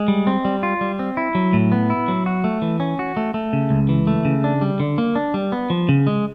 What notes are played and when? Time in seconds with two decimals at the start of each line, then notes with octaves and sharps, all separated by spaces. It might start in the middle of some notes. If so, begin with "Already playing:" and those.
Already playing: G#3
0.08 G3
0.27 C4
0.45 G3
0.63 F4
0.81 G3
0.99 C4
1.17 E4
1.35 F#3
1.53 A2
1.72 B3
1.90 E4
2.08 F#3
2.26 F#4
2.44 A3
2.62 E3
2.80 C#4
2.99 F#4
3.17 A3
3.34 A3
3.53 C#3
3.70 C#2
3.89 E3
4.07 A3
4.25 C#3
4.44 D4
4.61 G3
4.80 D3
4.98 A#3
5.15 D4
5.34 G3
5.52 B3
5.70 F3
5.89 C#3
6.07 G#3